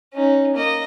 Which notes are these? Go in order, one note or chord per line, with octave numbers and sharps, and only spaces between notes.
C#4 D#4
A#3 D#5